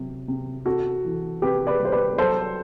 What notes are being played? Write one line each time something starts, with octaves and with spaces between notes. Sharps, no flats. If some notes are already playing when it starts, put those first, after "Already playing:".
Already playing: C3 F#3
C3
C3 F#4 A4
E3
C3 G4 B4
B4 D5
G3
C5
B4 D5
F#3 A4 C5